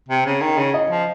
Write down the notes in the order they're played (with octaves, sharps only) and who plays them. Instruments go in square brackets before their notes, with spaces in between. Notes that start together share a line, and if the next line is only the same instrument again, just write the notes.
[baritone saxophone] C3
C#3
D#3
C#3
[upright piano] D#5
[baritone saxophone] F3